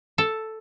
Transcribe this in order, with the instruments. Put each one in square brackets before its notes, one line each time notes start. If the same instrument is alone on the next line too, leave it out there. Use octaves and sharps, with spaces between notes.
[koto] A4